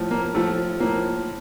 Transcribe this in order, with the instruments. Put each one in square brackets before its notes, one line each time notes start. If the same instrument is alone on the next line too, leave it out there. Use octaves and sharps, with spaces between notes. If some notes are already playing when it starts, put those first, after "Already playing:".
Already playing: [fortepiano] A2 F3
A#3
A2 F3 A3
A2 F3 A#3